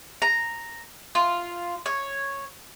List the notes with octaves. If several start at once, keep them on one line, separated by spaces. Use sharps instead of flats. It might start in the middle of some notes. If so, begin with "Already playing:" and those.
A#5
F4
C#5